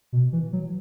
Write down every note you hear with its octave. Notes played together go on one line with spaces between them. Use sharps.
B2
E3
F#3